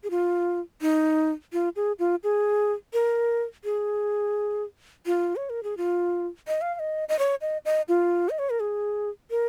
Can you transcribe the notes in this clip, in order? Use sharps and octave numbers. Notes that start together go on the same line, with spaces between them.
G#4
F4
D#4
F4
G#4
F4
G#4
A#4
G#4
F4
C#5
A#4
G#4
F4
D#5
F5
F5
D#5
D#5
C#5
D#5
D#5
F4
D#5
C#5
A#4
G#4
A#4